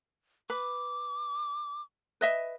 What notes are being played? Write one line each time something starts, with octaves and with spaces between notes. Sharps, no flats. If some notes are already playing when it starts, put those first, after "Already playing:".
B4 D6
B4 D#5 E5